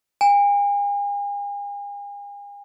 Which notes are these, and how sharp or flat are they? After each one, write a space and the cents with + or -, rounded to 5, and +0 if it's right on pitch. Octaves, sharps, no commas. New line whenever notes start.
G#5 -40